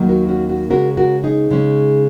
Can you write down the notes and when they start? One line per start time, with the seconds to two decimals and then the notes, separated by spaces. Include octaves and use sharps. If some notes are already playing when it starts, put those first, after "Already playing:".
Already playing: D#2 D#3 F#3 A#3
0.09 F#4 A#4
0.29 C#4 F#4
0.49 C#4 F#4
0.69 C#3 G#3 C#4 F#4 A#4
0.97 F#4 A#4
1.24 D#4 G#4
1.50 C#3 G#3 C#4